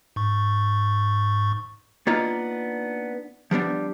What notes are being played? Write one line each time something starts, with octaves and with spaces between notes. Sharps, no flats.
G#2 C#6
A#3 B3 D4 D#4 F4
F3 G3 B3 D4